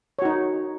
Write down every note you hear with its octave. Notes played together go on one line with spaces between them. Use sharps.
D#4 F#4 C#5